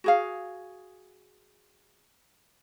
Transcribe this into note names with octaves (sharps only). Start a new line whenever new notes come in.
F#4 G#4 F5